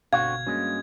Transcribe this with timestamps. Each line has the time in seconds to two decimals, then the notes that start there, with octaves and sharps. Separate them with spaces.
0.13 G1 B2 D3 C4 F#4 F5 G#6
0.47 G2 G#3 A#3 C#4 F#4